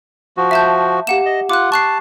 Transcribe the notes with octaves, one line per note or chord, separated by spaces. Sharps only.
F3 F#4
E5 A5 G6
A#3 G4 F#5 E7
D#5
F4 F#5 D6 F#6
A5 C#6 F#6 C7